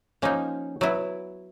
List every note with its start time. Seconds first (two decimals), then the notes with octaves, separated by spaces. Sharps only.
0.22 F3 A#3 C#4 D#4
0.81 F#3 B3 E4